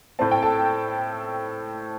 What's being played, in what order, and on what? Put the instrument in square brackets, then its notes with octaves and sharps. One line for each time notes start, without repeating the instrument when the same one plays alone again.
[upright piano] A2 A3 C4 A5
G5
A4 A5